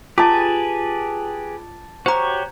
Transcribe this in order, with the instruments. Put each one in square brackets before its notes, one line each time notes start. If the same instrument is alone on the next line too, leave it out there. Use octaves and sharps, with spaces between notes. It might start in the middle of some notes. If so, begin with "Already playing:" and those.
[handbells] F4 [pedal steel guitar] G4 G#4 B4 [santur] A5 D6
[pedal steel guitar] F#4 G4 C#5 [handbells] C5 A#5